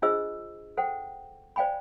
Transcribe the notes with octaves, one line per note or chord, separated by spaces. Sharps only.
D4 F4 G#4 C5 D#5 E6
A4 C5 F#5 G5
C5 D5 F5 G5 G#5 B5